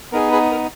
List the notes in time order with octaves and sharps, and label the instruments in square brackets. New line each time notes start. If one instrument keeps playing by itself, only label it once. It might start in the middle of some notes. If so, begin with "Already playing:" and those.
[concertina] B3 D#4 G#4 A#4
G#4 B4
A#4